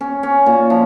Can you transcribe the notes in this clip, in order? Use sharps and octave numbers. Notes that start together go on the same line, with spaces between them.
C#4
C#4
A#2
F3